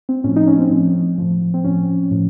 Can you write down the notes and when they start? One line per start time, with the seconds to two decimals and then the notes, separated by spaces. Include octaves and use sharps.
0.09 C4
0.24 A2 F3 C#4
0.36 D#4
0.47 C#4
0.59 C4
0.71 A2 F3
1.18 A2 F3
1.54 C4
1.64 A2 F3 C#4
2.11 A2 F3